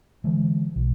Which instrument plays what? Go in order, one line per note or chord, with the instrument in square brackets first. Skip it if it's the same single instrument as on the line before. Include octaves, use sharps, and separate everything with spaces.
[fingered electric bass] D3 E3 G#3
B1